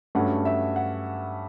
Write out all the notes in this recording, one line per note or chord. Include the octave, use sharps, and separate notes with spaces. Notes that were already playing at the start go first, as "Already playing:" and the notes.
G2 F#3 A3 C#4 F#5
E5
F#5